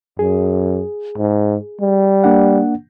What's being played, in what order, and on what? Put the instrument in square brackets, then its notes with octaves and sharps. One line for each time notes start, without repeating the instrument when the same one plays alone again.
[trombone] F#2 [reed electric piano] G#4
[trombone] G#2
G3
[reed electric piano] A#3 D4 F#5